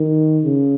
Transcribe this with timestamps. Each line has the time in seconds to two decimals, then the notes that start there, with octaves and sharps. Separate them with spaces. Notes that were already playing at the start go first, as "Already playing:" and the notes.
Already playing: D#3
0.44 C#3